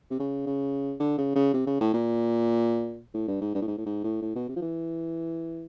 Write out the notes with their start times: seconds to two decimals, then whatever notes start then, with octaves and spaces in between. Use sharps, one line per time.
0.11 C3
0.19 C#3
0.46 C#3
1.00 D3
1.18 C#3
1.36 C#3
1.54 C3
1.67 C#3
1.81 A2
1.94 A#2
3.14 A2
3.28 G2
3.41 G#2
3.55 G2
3.62 A2
3.68 G#2
3.78 A2
3.86 G#2
4.04 A2
4.22 A2
4.35 B2
4.49 C3
4.56 F3
4.62 E3